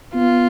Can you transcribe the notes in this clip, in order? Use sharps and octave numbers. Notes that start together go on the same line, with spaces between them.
B3 F4